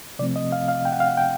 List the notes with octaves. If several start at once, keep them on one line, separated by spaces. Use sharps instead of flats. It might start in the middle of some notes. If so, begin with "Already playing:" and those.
C3 F3 A3 C4 D5
D#5
F5
F5
G5
F#5
F5
F#5
G5